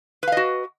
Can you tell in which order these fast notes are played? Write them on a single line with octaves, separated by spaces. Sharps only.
B4 F5 D#5 F#4